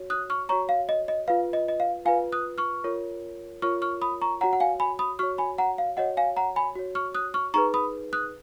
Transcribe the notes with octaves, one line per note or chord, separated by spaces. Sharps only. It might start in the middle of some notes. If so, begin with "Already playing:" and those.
Already playing: F#4 C#5
D#6 F#6
C#6 F6
F#4 C#5 A#5 C#6
F5
D#5
D#5
F4 B4 F5
D#5
D#5
F5
F4 B4 F5 G#5
D#6 F#6
C#6 F6
F4 A#4 C#5
F4 A#4 C#5 C#6 F6
C#6 F6
B5 D#6
A#5 C#6
F#4 C#5 F#5 A#5
F#5
F5 G#5
G#5 B5
B5 D#6
F#4 C#5 C#6 F6
G#5 B5
F#5 A#5
F5
F#4 C#5 D#5 F#5
F5 G#5
F#5 A#5
G#5 B5
F#4 C#5
C#6 F6
D#6 F#6
C#6 F6
D#4 G#4 B4 A#5 C#6
B5 D#6
D#6 F#6